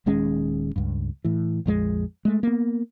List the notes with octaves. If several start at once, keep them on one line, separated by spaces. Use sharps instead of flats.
D#1 D#2 G#3 C#4
C#2 G2
A2 E3
A#1 F2 G#3
G#3 A3
A#3 B3